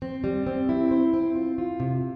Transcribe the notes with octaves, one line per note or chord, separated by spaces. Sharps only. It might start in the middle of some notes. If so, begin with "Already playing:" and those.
C4
G3
C4
E4
C5
C4
F4
F4
C3